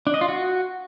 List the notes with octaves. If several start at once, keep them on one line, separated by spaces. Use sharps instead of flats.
D4
D#5
F4
F#4